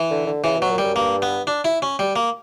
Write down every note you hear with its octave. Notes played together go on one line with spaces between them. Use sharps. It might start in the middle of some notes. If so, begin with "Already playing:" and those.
Already playing: E3
D3
D3
C#3 E3
B2 F#3
A#2
G3
F#2
G2 A#3
B3
D4
E4
C#4
G3
A#3